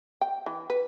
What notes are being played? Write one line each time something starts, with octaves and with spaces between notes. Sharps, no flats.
G5
E3
B4